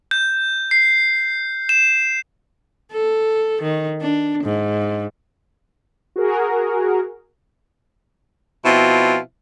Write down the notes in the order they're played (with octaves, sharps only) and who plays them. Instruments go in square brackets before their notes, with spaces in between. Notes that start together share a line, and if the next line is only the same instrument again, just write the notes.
[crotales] G6
C7
E7
[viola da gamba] A4
D#3
D4
G#2
[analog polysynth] F#4 G#4 A#4
[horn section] B2 F3 C4 E4 F4